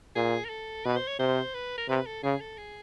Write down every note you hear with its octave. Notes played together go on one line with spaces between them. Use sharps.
A#2 G#4
A#4
A4
B2 B4
C5
C#5
C3 C5
B4
A#4
C3 B4
A4
C#3 G#4
A4
G#4